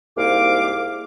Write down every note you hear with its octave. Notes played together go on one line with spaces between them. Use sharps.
C2 G#2 A#3 F5 D6